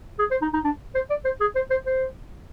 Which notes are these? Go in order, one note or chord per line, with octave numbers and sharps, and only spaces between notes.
G#4
C5
D#4
D#4
D4
C5
D5
C5
G#4
C5
C5
C5